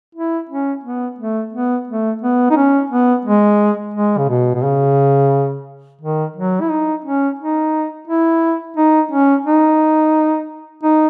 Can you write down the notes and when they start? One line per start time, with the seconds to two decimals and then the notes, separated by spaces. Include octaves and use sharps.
0.15 E4
0.50 C#4
0.84 B3
1.19 A3
1.53 B3
1.88 A3
2.22 B3
2.50 D#4
2.57 C#4
2.90 B3
3.25 G#3
3.94 G#3
4.18 C#3
4.29 B2
4.55 B2
4.63 C#3
6.01 D#3
6.36 F#3
6.61 E4
6.70 D#4
7.05 C#4
7.39 D#4
8.08 E4
8.77 D#4
9.11 C#4
9.45 D#4
10.84 D#4